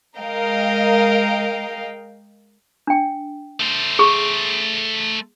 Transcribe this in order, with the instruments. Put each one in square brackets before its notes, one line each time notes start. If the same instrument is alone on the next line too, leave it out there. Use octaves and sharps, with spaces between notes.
[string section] G#3 A#4 D#5 F5 G5
[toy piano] D4 G5
[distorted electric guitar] A3 C5
[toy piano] G#4 C#6